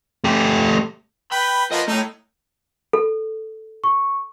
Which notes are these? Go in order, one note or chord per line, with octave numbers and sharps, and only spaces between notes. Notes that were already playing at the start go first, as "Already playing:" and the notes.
A3 G4
B4 G5 B5
F3 A#3 B3 D#5
A3 D#4 C#5
A4
C#6